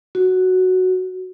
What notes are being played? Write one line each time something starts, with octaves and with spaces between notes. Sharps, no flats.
F#4